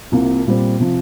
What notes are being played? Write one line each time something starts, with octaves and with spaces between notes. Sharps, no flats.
C2 C3 A#3 F4
A#2 G3 C4
C3 F3